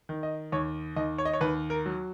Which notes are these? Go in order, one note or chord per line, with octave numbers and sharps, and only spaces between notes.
D#3
D#5
D#2 C#5
D#2 D#5
C#5
D#5
C#5
D#2 B4
A#4
F#3